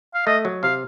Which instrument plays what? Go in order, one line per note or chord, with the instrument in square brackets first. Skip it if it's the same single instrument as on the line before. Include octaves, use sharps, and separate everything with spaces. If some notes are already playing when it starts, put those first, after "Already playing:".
[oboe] F5
[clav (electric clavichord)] A3 [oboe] D#5
[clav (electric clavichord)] F#3
[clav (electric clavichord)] C3 [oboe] F5